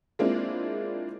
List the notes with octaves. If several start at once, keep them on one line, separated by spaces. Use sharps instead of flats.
G#3 A#3 C4 D4 E4 F4